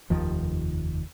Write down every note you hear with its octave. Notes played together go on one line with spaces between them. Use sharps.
F1 D#2 D#3 F3